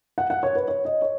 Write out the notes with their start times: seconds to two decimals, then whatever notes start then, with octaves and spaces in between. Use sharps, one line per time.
0.18 F#5
0.30 F#5
0.43 C#5
0.55 B4
0.68 C#5
0.85 D#5
1.02 C#5